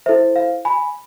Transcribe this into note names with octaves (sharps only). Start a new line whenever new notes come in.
E4 A4 C5 E5
F5
G#5 B5